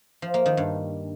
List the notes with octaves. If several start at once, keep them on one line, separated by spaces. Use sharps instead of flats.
F3
A#3
D#3
G2